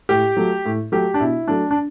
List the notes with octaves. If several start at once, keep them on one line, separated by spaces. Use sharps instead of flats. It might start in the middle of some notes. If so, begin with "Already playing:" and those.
A2 G4
F#3 A3
A2
F#3 A3 G4
D4
B2 E4
F#3 A3 D4
D4